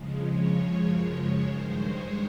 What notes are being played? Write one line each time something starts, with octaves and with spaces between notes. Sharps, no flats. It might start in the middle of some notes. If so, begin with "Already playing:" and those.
Already playing: F2 C#3 F3 G#3
C#5
F#2 C#3 F3 G#3
G2 D#3 G#3 C5
C#5